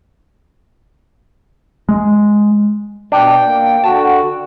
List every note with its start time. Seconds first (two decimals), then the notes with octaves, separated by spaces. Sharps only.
1.89 G#3
3.12 B2 D4 G5
3.45 A#3
3.84 D3 F#4 A5